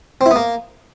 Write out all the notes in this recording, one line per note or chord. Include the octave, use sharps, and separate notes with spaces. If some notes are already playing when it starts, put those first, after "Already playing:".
C4
E4
B3
A#3